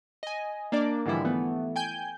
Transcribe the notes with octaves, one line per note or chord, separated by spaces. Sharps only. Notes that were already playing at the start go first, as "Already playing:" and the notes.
D#5 G#5
A#3 D4 D5
G#2 D3 E3 F3 G3 E4
E3 A3 B3
G5 G#5 G6